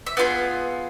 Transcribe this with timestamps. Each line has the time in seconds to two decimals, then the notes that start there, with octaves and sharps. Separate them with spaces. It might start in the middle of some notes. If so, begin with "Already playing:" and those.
0.07 E5
0.17 B3 D4 F4 G#4 F5